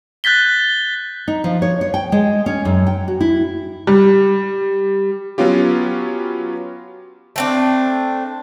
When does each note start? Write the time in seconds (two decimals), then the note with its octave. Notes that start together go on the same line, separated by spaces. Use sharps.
0.24 F#6 G6 A6 B6 G7
1.28 D#4
1.44 F3
1.62 C#5
1.81 C#5
1.94 G5
2.12 G#3
2.46 C#4
2.65 F#2
2.87 G5
3.08 F#4
3.21 E4
3.87 G3
5.38 F#3 B3 C#4 F4 G4
7.36 A3 C4 D4